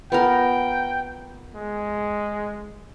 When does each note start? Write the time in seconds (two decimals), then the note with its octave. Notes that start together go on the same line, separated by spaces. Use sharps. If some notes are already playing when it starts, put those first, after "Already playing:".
0.12 B3 F4 A#4 G5
1.55 G#3